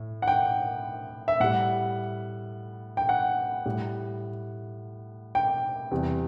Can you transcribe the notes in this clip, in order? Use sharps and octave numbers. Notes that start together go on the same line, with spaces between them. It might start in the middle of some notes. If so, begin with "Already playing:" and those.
Already playing: A2
F#5
G5
E5
A2 G3 F#5
G5
F#5
A2 G3
G5
E2 C3 G3